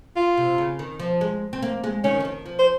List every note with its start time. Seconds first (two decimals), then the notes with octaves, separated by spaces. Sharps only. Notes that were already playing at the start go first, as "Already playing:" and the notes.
0.16 F4
0.37 C3
0.58 C#3
0.79 D#3
1.00 F3
1.21 G#3
1.53 C4
1.62 A#3
1.84 G#3
2.04 D#3 C#4
2.20 F3
2.25 D#3
2.46 F3
2.59 C5